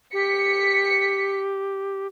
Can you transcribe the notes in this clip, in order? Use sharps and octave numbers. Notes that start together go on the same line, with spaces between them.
G4 B6 C#7